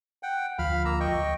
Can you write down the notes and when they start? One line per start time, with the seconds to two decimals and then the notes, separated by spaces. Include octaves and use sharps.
0.23 F#5 G5
0.59 D2 F3 F5 B5 F6
0.85 A#3 A#5 E6
1.00 D#5 G5 C#6